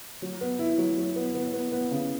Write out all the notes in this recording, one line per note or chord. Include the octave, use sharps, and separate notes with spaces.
F#3
B3
E4
F#3
F#3
B3
B3
B3
B3
C#3